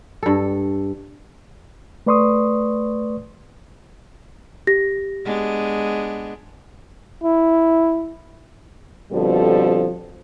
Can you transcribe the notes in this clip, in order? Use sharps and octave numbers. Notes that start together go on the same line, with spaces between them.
G2 A4
A3 B4 D5 C6 C#6 D#6
G4 A#6
G#3 B3 D4
E4
B2 D3 F3 G3 C4 A4